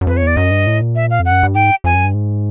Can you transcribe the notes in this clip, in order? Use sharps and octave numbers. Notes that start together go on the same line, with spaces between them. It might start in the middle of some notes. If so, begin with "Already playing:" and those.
F#2
F2 B4
C#5
E2
D5
F#2 D#5
G2
A2
A#2
E5
F5
F2
F#5
F#2
G2
G#2 G5
F2 G#5
F#2
G2
G#2